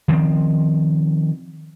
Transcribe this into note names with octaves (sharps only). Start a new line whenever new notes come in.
D#3 F3 C4